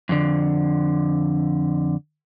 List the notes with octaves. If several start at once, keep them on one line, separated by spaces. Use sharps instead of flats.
F2 D3